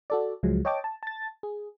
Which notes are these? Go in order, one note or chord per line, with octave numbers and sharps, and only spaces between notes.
F#4 A4 D5
C#2 F3 F#3 G#3
C#5 D#5 G5 A5 D6
A5
A5 A6
G#4